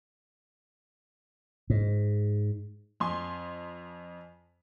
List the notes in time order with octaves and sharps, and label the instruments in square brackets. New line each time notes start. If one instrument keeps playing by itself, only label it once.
[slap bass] G#2
[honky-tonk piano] F2 G#5 C6